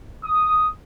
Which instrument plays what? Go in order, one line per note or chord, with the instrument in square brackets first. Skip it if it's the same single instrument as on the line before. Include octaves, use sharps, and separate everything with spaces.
[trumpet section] D#6